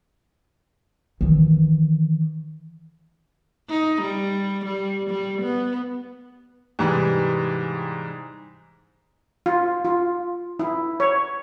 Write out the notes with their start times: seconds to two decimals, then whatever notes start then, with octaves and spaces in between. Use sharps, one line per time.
1.21 D#3 E3
3.69 D#4
4.02 G3
4.65 G3
5.10 G3
5.42 B3
6.79 G#2 C3 E3 G3
9.46 F4
9.85 F4
10.60 E4
11.00 C#5